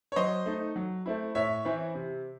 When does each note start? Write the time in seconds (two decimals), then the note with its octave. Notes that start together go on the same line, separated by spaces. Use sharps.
0.12 C#5
0.16 F#3 C5 D#5
0.46 A3 D#4
0.76 F#3
1.06 A3 C4 E4
1.35 A2 C#5 E5
1.65 E3 C4 E4
1.95 C3